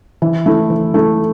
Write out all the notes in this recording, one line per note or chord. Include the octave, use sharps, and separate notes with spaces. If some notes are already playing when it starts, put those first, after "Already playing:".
E3
A3 E4
E3
A3 E4